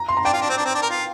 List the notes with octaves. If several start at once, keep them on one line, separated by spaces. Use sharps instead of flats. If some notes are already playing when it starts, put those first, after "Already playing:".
Already playing: A#5
C6
A#5
D4 G5
F4
D4
C4
D4
C4
D4
A#4
F4